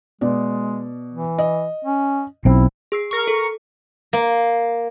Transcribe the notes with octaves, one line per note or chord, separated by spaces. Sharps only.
B2 G#3 D5
E3
D#5
C#4
B1 C4 E4
G#4 E6 C7
A#4 C#6
A4
A#3